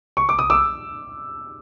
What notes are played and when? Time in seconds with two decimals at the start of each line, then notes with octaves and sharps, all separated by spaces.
0.17 C#6
0.29 D6
0.39 D#6
0.50 D6 E6